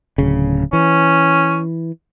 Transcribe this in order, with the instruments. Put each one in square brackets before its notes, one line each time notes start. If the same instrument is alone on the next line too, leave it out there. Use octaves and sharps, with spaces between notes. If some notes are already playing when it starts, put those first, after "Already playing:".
[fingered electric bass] D1 C#3
[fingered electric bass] E3 [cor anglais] C#4